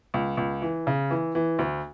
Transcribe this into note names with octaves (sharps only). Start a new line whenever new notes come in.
C#2
C#2
E3
C#3
E3
E3
D2